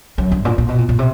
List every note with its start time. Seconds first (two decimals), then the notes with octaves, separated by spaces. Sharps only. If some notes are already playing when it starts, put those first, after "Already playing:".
0.18 F#2
0.32 G2
0.45 A#2
0.58 A#2
0.68 B2
0.78 A#2
0.89 A#2
0.99 C3